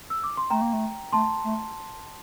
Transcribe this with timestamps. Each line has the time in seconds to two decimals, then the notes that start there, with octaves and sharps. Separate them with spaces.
0.10 E6
0.24 D6
0.37 C6
0.50 A3 G5 A#5
0.62 A#3
0.73 A3
1.12 A3 A5 C6
1.44 A3